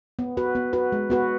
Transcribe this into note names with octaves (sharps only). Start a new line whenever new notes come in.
B3
F#4 B4
B3
F#4 B4
G#3
B3 F#4 B4